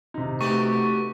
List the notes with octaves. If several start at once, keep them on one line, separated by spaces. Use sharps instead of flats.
C3 D#4
A3 B3 F#4 G4 C#6